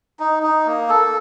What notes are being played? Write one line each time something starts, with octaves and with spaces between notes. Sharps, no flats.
D#4
D#4
A#3
A4